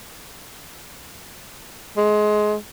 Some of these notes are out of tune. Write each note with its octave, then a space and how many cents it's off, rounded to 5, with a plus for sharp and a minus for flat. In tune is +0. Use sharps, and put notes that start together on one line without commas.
G#3 +20